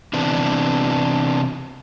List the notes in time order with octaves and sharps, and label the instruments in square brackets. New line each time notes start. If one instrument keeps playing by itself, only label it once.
[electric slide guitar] C3 E3 B3 D4